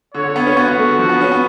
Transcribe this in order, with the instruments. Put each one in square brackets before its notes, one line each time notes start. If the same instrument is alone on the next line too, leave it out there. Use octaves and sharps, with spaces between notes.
[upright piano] D3 [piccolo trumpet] C#5
[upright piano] D3
B3
C#4
[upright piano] B3 [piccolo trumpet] F#4
[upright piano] B3
A3
D3
F3
B3
C#4
B3